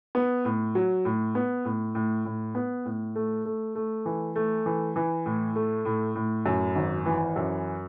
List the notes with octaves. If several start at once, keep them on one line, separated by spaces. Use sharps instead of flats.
B3
A2
F#3
A2
B3
A2
A2
A2
B3
A2
A3
A3
A3
E3
A3
E3
E3
A2
A3
A2
A2
F#2
G#1
E3
F#2